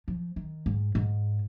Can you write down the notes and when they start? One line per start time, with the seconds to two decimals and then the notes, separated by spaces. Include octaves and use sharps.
0.08 F3
0.36 D#3
0.66 G#2
0.95 G#2